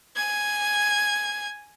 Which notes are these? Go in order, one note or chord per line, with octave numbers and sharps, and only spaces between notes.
G#5 G#6